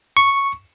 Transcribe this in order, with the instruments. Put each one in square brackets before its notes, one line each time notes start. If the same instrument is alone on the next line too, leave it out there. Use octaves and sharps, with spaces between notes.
[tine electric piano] C#6